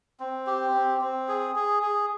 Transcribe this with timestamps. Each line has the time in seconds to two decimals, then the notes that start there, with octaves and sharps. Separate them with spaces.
0.20 C4
0.47 G4
0.74 C4
1.01 C4
1.28 G#4
1.56 G#4
1.83 G#4